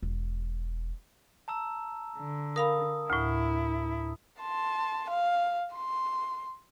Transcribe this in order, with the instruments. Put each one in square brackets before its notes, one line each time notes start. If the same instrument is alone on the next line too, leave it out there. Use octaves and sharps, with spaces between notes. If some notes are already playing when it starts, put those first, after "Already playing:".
[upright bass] E1
[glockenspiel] A5 A#5 E6
[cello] D3
[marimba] A#4 F5 B5 [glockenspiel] D#6
[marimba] D2 A2 [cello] E4
[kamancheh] A5 C6
F5
C6